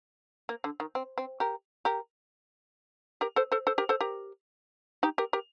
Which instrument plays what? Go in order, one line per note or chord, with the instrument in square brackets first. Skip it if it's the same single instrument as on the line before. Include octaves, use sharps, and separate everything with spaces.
[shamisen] A#3
D3
D#3
C4
C4
G4 A#4
G4 A#4
G4 A#4
A4 C5
A4 C5
A4 C5
G4 A#4
A4 C5
G4 A#4
D#4 G4
G4 A#4
G4 A#4